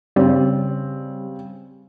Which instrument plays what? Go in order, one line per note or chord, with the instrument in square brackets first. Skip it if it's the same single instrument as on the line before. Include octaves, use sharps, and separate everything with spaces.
[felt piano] C#3 C4 [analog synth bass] G3